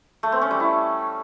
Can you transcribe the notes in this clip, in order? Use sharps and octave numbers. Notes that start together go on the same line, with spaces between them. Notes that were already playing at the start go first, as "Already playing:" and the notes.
A3
C4
C#4
G3
E4